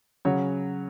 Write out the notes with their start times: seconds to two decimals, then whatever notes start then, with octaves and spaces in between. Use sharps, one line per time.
0.25 C#3 F#3 C#4 C#5